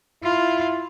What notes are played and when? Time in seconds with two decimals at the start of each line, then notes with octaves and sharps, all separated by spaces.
0.24 E4 F4